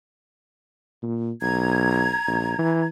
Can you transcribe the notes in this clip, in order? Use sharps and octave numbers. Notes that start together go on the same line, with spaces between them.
A#2
B1 A#5 G#6
A#1
E3